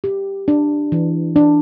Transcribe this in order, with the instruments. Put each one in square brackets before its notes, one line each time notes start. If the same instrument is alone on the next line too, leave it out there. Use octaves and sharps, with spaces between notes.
[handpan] G4
D4
E3
D4